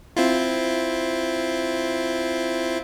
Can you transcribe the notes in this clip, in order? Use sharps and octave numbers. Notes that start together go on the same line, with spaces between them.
C4 E4 F4